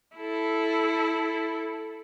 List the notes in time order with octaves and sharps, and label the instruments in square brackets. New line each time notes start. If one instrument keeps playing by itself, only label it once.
[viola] E4 A4